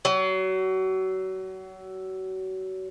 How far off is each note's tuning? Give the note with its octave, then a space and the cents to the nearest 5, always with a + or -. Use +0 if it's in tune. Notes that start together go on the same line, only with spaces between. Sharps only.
F#3 +30